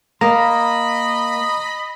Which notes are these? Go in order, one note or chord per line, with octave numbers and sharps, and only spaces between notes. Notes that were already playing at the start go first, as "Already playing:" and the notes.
A#3 D#5 A#5 B5